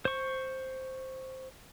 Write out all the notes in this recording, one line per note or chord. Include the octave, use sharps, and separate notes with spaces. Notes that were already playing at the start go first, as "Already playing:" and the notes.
C5 C#6